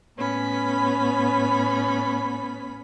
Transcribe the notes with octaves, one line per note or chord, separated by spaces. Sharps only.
A2 B3 C#4 B4 B5